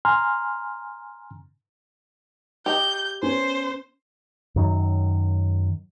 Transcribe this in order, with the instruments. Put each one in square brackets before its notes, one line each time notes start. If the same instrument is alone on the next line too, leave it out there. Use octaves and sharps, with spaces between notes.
[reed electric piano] G#5 A#5 C6 F6
[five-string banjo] G4 D#5 [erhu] G6
[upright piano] B3 C#4 [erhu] C5
[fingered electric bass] F#2 D#3 F#3